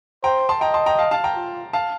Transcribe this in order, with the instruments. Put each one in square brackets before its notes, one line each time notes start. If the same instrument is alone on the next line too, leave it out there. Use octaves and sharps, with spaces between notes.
[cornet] C5 [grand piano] G5 A#5
[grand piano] A5 C6
[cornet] D#5 [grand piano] G5 A#5
[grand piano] A5 C6
G5 A#5
F5 A5
F5 A5
G5 A#5
[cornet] F4
[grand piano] F5 A5